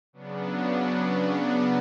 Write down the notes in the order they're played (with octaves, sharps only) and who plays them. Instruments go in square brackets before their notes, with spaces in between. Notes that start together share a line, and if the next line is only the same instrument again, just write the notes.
[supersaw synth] C#3 F#3 B3 D4